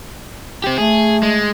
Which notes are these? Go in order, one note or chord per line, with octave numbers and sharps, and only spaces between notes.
C4 G4
A3 G#4
G#3